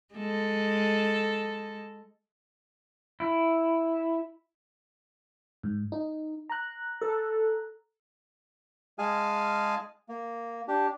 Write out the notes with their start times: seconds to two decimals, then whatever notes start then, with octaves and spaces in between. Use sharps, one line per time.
0.14 G#3 A4
3.20 E4
5.63 G#2
5.92 D#4
6.50 A#5 F#6
7.01 A4
8.99 G#3 G#4 F5 G#5 A5 F6
10.09 A#3
10.68 D4 G4